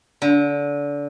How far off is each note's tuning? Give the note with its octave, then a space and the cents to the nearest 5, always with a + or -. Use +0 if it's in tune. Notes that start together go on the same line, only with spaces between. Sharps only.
D3 -25